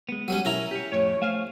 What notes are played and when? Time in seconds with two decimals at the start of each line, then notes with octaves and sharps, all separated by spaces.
0.09 G#3 B3
0.28 F#3 G3 C#4 D#7
0.45 B1 C#4 E4 A#4 A#5
0.71 G4 C#5
0.92 F2 A2 G4 C#5
1.22 A3 C5 F5 G#5